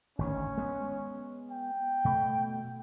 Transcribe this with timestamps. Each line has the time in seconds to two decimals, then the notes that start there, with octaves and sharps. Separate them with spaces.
0.19 G#1 D2 D#3 C#4
0.58 G#3 B3
1.51 G5
2.05 B2 A3